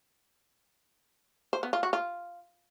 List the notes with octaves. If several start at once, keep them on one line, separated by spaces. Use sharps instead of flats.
C5
B3
F4
F#4
F4